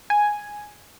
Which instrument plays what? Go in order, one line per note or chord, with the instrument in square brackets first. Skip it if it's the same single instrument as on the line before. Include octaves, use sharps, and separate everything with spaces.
[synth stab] G#5